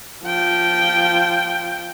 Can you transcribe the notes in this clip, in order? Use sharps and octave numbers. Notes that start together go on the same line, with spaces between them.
F3 G5